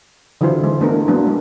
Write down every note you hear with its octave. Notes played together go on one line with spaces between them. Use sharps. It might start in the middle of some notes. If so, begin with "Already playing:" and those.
D3 E3 F#3 E4 F4 C5
G#3
A3 B3 D4 A#4
F#3 A#3 B3 D4
G#3